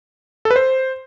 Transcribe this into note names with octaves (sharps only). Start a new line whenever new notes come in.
A4
B4
C5